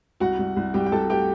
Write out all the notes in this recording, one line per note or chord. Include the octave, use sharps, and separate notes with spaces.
C2 F#4 F#5
C2
C2
C2 G4 G5
G5
C2 A4 A5
A3 G4 G5